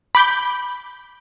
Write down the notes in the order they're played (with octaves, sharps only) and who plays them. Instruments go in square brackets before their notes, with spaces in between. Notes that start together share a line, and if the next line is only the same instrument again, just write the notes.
[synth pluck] B5 D6 G6